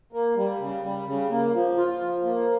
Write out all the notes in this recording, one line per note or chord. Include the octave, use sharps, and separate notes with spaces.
A#3
G3
C#3
G3
C#3
A#3
F3
F4
F3
A#3